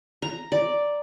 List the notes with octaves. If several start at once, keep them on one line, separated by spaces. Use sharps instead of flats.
A#5
D5